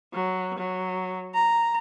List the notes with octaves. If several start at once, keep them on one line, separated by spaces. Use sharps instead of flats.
F#3
F#3
A#5